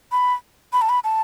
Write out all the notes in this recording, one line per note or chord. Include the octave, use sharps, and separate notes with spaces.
B5
B5
A5
B5
A5